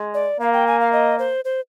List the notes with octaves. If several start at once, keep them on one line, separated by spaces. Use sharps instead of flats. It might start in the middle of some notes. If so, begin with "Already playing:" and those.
Already playing: G#3
D5
A#3 F5
G5
G#5
F5
D#5
C5
C5